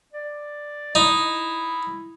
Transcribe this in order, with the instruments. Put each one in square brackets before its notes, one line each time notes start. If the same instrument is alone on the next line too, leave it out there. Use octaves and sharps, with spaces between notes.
[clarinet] D5
[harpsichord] D#4 [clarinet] E4